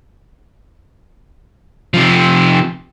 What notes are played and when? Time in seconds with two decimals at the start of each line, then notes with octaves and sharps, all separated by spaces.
1.94 C3 F3